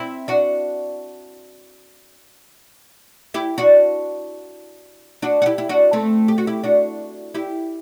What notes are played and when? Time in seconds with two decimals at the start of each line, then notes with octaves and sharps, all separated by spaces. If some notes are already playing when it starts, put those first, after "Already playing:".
Already playing: C4 E4
0.28 D4 F#4
3.34 E4 G4
3.58 D4 F#4
5.22 D4 F#4
5.42 F#4
5.46 E4 G4
5.58 E4
5.69 D4 F#4
5.93 A3 C4
6.28 G4
6.38 F#4
6.47 E4 G4
6.64 D4 F#4
7.34 E4 G4